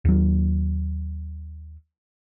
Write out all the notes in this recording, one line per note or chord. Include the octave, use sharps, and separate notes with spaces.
D#2 F#3